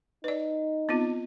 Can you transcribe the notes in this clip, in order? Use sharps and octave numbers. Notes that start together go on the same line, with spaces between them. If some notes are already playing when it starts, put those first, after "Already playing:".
D#4 B4 D5
B3 C4 F4